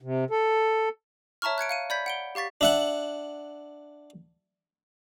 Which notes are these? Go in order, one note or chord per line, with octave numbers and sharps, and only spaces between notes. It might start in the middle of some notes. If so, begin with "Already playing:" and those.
C3
A4
C#5 E5 A5 A#5 C#6 F6
F#6 G#6 C#7 D7
F5 C#7 D#7
D5 B5 G6 G#6 B6
F#5 D7 G7
G4 F5 C#6 A6 B6
D4 E5 F#5